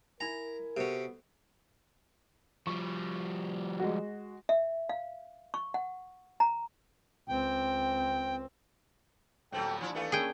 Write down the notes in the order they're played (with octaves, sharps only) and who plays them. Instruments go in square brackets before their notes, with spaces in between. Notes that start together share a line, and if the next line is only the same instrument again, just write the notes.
[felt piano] E4 G#5 [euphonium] A#4 [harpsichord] A#5
[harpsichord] C3 C#4 [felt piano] B3 F#4 A4
[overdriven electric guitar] F3 G3 [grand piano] C#6
[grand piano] G#3 F#4
[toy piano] E5
F5
C#6
F#5
A#5
[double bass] C#2 C4 [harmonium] G5
[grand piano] D#1 [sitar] F#3 B3 C4 [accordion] A4 G5
[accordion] D#2 D4 G#5 [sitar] F3 E4
[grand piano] E3 A4 F5 [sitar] A3 B3
[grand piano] A#3 C#4 [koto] G#4 G5